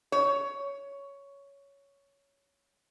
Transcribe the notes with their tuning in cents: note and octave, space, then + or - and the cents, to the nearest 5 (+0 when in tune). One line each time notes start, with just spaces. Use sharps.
C#5 +10